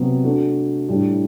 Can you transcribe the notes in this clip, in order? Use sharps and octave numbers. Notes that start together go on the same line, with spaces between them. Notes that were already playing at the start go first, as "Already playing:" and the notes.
Already playing: C3 F#3 B3
A3 D4 F#4
A2 G3 D4